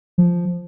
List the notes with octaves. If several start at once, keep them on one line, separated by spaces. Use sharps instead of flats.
F3